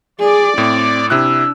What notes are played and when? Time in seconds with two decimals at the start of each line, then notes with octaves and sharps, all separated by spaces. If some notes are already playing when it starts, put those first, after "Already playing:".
0.20 G#4 D5
0.58 A2 C4
1.10 C3 D4 E4 E6 F#6